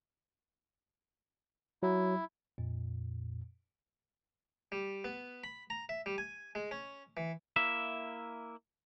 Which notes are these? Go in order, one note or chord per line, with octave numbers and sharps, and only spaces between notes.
F#3 E4
F2 A#2
G3
B3
B5
A#5
E5
G3
G#5
G#3
C#4
E3
A#3 E4 E5